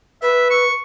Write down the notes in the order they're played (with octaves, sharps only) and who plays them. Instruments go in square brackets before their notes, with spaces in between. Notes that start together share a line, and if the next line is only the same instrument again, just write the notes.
[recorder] B4 [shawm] E5
[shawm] C#6